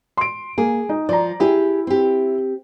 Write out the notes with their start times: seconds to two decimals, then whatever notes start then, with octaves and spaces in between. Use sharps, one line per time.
0.17 C6 D7
0.58 A#3 G#4
0.89 D#4
1.09 F3 D5 A#5
1.40 E4 G4 G#4
1.87 C4 G4